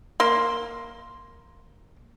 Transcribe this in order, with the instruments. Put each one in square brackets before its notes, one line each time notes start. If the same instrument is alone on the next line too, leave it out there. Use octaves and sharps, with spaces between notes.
[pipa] A#3 C6